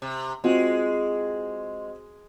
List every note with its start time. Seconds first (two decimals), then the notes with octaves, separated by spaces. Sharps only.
0.02 C3
0.44 G#3 C4 F4 F#4